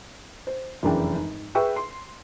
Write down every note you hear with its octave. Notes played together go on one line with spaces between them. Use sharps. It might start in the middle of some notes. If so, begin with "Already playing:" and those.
C5
F1 F#2 E3 D4 G#4 G5
G#2
G#4 B4 E5 G5 C#6 E6
C6